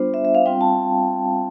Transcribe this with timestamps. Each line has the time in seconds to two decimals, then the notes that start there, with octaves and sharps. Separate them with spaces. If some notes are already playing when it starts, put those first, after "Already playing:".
Already playing: G3 B3 D4 F4 C5
0.14 E5
0.25 E5
0.35 F5
0.46 G3 C4 F4 G5
0.61 A5